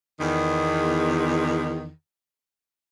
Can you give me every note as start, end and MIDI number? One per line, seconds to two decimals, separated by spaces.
0.20 1.90 40
0.20 1.90 51